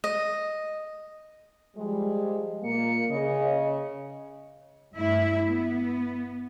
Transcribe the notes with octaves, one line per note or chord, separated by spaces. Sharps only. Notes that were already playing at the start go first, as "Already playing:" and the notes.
D#5
F3 G3 G#3
A#2 A#3 C#7
C#3 D#5
G2 A3 E4 E5
B3